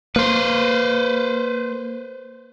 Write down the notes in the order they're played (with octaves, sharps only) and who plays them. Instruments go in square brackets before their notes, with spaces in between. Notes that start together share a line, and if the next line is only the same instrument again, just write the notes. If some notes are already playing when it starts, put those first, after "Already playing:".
[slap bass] A#3 [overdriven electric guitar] B4 C5